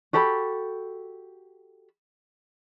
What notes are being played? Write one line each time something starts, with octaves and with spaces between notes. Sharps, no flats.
F#4 G4 A4 B5